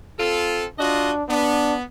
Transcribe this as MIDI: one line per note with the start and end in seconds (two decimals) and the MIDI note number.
0.19 0.66 60
0.19 0.66 65
0.19 0.66 69
0.79 1.24 62
0.79 1.12 65
0.79 1.12 66
0.79 1.12 75
1.29 1.83 59
1.29 1.75 62